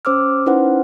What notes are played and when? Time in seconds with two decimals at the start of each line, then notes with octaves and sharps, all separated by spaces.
0.05 C#4 C5 D6 E6 F6
0.46 C#4 D#4 E4 B4 C5 F#5